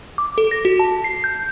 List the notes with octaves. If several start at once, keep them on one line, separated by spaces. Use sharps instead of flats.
D6
A4
A#6
F#4
A5
C7
G6